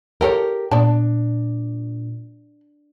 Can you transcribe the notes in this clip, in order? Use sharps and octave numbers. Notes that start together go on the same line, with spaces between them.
E4 G4 A4 A#4 C#5
A#2 B3 D4 D5 A5